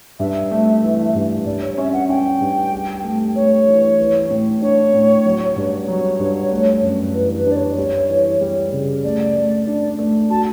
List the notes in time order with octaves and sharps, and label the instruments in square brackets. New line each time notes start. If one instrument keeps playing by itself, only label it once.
[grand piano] G2 [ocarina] E5
[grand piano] A3
E3
G2
[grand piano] G2 [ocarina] D5
[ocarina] C#5
[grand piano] C#4 [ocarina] E5
[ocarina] F#5
[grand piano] C#4 [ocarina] G5
[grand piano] G2
G4
A3
[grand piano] A3 [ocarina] C#5
[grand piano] E3
E3
A2
[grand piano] D4 [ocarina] C#5
[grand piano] A2
F#3
G2
[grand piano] F#3 [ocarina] C#5
[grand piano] G2
A3
F#2
[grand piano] E3 [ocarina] B4
[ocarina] B4
[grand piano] D4
[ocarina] D5
C#5
[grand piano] G3
E3
G3
C#3
[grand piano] A3 [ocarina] D5
[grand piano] A3
D4
A3
[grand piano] F#4 [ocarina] A5